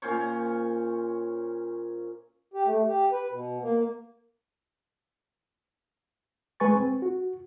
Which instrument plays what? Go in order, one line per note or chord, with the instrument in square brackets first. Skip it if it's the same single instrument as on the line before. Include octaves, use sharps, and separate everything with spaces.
[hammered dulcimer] A#2 C#4 C5 C#5
[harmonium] G4
A3
G4
B4
B2
A#3
[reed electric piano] G#3 B4 G#5 C#6 A6
C4
F#4